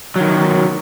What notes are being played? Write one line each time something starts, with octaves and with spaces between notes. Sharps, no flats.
D#3 F#3